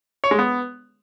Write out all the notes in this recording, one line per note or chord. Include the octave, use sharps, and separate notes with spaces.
C#5
G#3
B3